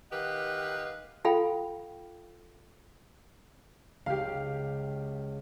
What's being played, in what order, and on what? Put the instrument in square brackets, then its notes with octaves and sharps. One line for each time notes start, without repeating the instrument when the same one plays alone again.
[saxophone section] D#3 G4 B4 D#5 F5 F#5
[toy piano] F4 A4 F5 G5 B5
[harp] C#2 [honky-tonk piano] G4 F5